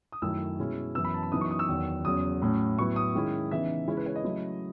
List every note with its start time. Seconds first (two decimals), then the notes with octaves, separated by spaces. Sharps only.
0.12 D#6
0.22 F#2 D#3 A3 C#4 E4 E6
0.59 B2 G#3 C#4 E4
0.95 F#2 E3 B3 E6
1.05 B5
1.14 A5
1.23 B5
1.32 F#2 E3 B3 D#4 D#6
1.41 C#6
1.51 D#6
1.59 E6
1.68 E2 D#3 F#3
2.05 E2 C#3 F#3 D#6
2.42 A2 F#3 A3 C#4
2.78 A2 F#3 B3 E4 C#6
2.96 D#6
3.15 D#3 G#3 C#4 E4
3.51 C#3 E3 B3 D#4 E5
3.87 C#3 G#3 C#4 E4 C#5
3.97 B4
4.06 C#5
4.16 D#5
4.24 C#3 F#3 A3 E4